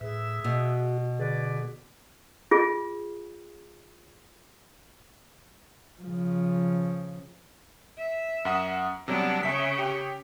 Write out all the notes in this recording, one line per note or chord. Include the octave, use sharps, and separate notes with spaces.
A2 G#4 B4 E5 E6
B2 F#4
D3 G#4 B4 D5
F4 G#4
C#3 F3
E5
F#2 F#5 D#6
C3 F#3 G3 B3 D4
C#3 C#4 E5 B6
G4